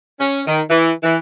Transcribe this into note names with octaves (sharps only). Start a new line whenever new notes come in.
C#4
D#3
E3
E3